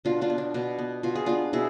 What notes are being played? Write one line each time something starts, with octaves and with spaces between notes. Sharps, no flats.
B2 D4 F4
D4 F4
B3
D4
B2 D4
B3
B2 F4
G#4
B3 D4 F4
B2 E4 G#4